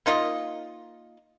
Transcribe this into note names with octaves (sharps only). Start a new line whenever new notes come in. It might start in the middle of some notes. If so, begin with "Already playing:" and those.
A#3 D#4 F4 D#5